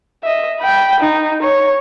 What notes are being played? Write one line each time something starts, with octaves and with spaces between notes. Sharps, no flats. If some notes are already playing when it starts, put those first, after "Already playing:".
D#5 E5
G5 B5
D#4
C#5